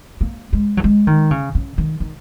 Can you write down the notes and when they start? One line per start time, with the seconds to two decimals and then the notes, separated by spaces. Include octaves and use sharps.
0.21 A#3
0.53 G#3
0.77 F#3
0.84 G#3
1.07 D#3
1.31 C#3
1.55 C#3
1.78 D#3
2.00 D#3